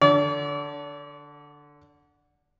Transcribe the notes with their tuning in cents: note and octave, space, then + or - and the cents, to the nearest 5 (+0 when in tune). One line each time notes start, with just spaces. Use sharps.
D3 +0 D5 -40